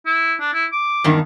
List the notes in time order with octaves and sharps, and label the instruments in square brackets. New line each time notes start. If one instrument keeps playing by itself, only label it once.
[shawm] E4
D4
E4
D6
[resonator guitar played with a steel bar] E2 G2 D#3